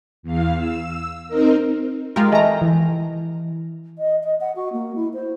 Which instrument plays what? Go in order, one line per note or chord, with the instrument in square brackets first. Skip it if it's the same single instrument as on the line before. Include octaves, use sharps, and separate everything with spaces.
[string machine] E2 F5
E6
C4 D#4 A#4
[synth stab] G#3 F4 A#4 [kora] G4
[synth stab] E3 A#5 [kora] G#3 A3 D#5
[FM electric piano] E3
[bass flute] D#5
D#5
F#5
F#4
A#3
E4
C5